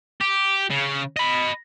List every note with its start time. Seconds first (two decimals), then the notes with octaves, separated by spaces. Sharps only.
0.21 G4
0.70 C#3
1.16 D#5 B5